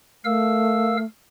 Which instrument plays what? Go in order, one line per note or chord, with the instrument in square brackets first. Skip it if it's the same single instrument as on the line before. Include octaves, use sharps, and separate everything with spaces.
[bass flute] A3 [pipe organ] A#4 F5 E6